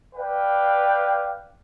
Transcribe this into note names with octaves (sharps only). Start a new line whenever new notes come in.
B4 D5 F5 G5